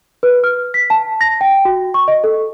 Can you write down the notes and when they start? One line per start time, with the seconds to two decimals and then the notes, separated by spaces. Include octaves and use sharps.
0.23 B4
0.44 F6
0.74 B6
0.90 A5
1.21 A#6
1.41 G5
1.65 F#4
1.94 C#6
2.08 D#5
2.24 A4